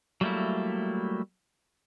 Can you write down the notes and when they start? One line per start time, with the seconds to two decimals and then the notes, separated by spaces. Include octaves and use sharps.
0.21 F#3 G3 A3 A#3 E4